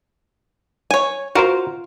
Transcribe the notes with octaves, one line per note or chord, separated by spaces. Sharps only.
C#5 G#5
F4 F#4 A#4 C5